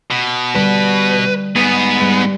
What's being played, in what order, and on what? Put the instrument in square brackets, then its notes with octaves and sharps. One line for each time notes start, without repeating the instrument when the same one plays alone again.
[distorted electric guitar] B2
[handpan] D3 G3 [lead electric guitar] B4
[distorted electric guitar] G#2 G#4 [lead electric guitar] B3
[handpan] G3